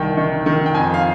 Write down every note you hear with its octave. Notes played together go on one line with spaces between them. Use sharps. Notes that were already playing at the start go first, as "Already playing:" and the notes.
Already playing: C2 D#3 G5
D#3
D#3
G5
F2 G#5
F5